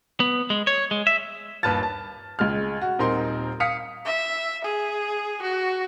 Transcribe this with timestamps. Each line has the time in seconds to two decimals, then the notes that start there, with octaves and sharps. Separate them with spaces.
0.20 B3
0.50 G#3
0.67 C#5
0.91 G#3
1.07 E5
1.63 G1 D#2 B4 A5 F6 A6
1.83 A5
2.39 C#2 G#3 F6
2.82 F#4
2.99 D#1 C4 D#4 A#4 C6
3.60 F5 D#6 B6 C#7
4.05 E5
4.64 G#4
5.42 F#4